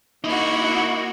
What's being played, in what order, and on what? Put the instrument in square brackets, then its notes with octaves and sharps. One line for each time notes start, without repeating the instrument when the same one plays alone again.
[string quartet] A#3 F#4 [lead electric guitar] D#4 E4